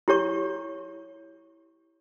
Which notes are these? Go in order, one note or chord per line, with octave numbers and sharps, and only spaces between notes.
E4 G4 C#5 C#6